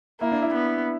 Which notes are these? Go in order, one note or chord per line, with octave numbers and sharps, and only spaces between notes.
A#3 E4
D4
E4
B3